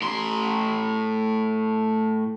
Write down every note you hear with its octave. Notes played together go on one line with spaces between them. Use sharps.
A2 C6